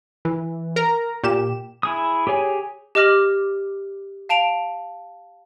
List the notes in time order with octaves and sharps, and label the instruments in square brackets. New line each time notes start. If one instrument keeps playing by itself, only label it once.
[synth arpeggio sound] E3
A#4 A#5
A#2 G4 E7
[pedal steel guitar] E4 G#4 D#6
G4 G#4 C#5 G#5
[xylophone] G4 D#5 D6 F6 A#6 F#7
F5 A5 D7 F7